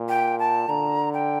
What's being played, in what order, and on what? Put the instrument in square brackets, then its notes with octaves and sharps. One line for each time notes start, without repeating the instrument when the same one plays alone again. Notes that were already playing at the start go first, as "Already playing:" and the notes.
Already playing: [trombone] A#2
[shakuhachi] G5
A5
[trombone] D3 [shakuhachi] A#5
[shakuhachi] G5